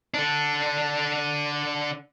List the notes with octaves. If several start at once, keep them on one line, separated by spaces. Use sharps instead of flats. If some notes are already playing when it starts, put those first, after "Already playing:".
D3 D4